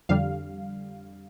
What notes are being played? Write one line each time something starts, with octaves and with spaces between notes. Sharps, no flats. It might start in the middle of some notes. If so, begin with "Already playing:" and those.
F2 D3 G3 F5